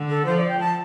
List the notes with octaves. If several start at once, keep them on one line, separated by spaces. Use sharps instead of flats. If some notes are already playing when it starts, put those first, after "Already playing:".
Already playing: D3
A4
F3 C5
D5
G5
A5